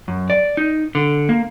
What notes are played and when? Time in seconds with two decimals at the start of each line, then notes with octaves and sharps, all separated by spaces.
0.08 F#2
0.30 D5
0.57 D#4
0.95 D3
1.29 A#3